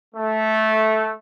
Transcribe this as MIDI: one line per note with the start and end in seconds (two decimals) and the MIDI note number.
0.15 1.12 57